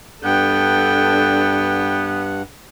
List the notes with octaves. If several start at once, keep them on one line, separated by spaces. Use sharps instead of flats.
G2 B3 D4 A4 F#5 G5